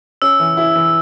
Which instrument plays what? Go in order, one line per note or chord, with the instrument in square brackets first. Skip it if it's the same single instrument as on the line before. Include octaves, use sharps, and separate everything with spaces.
[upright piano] C#4 [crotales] E6
[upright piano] E3
E4
E3